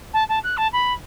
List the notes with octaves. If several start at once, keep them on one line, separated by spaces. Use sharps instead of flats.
A5
A5
F#6
A5
B5